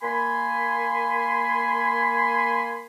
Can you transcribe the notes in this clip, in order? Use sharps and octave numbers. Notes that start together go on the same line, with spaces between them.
A#3 G#5 B5 C6